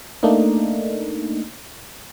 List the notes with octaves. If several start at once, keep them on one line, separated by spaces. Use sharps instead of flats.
A3 A#3 D4 D#4